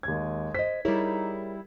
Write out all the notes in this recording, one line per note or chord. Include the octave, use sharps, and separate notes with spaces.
D#2 G#3 G#6
C5 D#5 B6
G3 D#4 E4 G#4 A#4 C#5